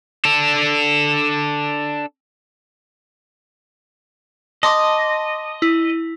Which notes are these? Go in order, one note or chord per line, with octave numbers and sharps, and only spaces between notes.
D4 A4
D#5 A5 C6 D6
E4